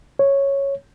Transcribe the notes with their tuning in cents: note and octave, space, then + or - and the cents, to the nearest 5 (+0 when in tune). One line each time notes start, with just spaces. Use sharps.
C#5 -5